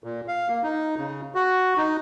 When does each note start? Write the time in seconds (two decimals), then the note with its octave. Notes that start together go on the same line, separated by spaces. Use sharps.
0.04 A#2
0.28 F5
0.49 A#3
0.63 D#4
0.98 C#3
1.35 F#4
1.77 D#4